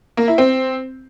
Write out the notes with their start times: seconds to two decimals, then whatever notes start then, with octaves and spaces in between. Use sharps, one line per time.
0.17 A#3
0.28 E4
0.38 C4